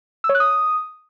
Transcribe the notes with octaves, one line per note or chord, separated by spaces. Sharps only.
E6
C#5
F#6
D#6